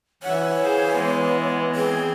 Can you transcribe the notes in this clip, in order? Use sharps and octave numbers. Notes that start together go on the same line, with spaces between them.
E3 C#5 E5 F#5
G#4 C5 F5
G#3 B3
C4 G#4